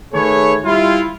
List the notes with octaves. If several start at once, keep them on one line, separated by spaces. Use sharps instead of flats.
D#3 A3 G#4 B4 C#5
G3 E4 F4